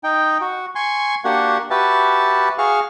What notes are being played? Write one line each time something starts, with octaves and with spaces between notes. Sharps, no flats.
D#4 G5
F#4
G#5 C6 C#6
A#3 D4 F#4 G4 F#5
F#4 G4 B4 E5 A5
F#4 G#4 F5 C#6